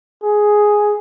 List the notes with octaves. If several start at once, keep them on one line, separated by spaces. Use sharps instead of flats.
G#4